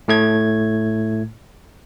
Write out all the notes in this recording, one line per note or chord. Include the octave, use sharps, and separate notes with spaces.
A2 A3 G#6